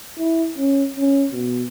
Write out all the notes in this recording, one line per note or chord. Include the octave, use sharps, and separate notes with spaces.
E4
C#4
C#4
B2